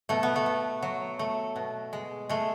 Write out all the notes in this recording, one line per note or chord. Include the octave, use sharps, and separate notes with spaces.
B2 A3
B3
A3
B2
F#3
A3
B2
G#3
G#3 A3